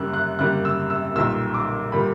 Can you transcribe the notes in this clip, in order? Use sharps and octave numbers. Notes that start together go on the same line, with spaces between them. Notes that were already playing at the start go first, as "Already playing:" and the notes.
Already playing: F#2 C#3 G3 A#3 E6 F#6
F#6
F#2 C#3 G3 A#3 F#6
E6
E6
B1 A#2 G3 A#3 E6
D6
A#2 G3 A#3 B5